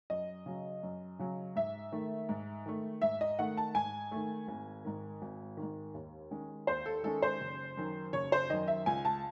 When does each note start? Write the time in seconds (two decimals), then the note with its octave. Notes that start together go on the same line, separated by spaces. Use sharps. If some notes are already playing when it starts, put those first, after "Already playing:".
0.10 F#2 D#5
0.46 C#3 F#3
0.83 F#2
1.19 C#3 F#3
1.56 G#2 E5
1.92 D#3 A3
2.29 G#2
2.66 D#3 A3
3.02 G#2 E5
3.21 D#5
3.39 D#3 A3 F#5
3.57 A5
3.75 G#2 G#5
4.11 D#3 A3
4.48 G#1
4.85 G#2 D#3
5.22 G#1
5.57 D#3
5.62 G#2
5.94 D#2
6.31 D#3 G#3 C#4
6.67 D#2 C5
6.86 A4
7.03 D#3 G#3 C#4 A4
7.22 C5
7.41 F#1
7.77 F#2 D#3
8.13 F#1 C#5
8.32 C5
8.50 F#2 D#3 D#5
8.68 E5
8.86 C#2 G#5
9.05 A5